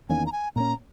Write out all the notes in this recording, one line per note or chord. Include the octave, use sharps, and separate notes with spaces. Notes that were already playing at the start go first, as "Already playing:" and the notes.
E2 D#3 A#3 C#4 G#5
A#5
G#5
A#2 A#3 C#4 A#5